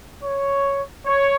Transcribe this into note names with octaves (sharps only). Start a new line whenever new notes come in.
C#5
C#5